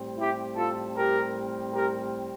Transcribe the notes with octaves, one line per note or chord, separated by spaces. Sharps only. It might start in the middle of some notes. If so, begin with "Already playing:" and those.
Already playing: A2 G3 C4
E4 G4
F4 A4
G4 A#4
G4 A#4